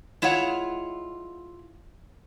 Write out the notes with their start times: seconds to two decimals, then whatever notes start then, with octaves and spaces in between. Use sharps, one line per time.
0.22 G#3 E4 F4 C#5 F#5